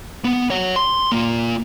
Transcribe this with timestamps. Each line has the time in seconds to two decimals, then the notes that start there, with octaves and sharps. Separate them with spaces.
0.24 B3
0.50 C#5 F#5
0.76 C6
1.12 A#3 F4